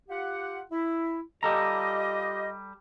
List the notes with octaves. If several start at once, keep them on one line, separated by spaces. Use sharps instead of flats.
F4 G4 F#5
E4
G3 F4 G4 A4 D#5 A#5